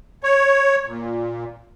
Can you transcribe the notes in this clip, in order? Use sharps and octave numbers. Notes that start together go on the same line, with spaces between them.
C#5
A#2